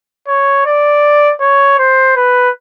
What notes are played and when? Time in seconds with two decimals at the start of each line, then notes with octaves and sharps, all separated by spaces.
0.28 C#5
0.66 D5
1.40 C#5
1.78 C5
2.16 B4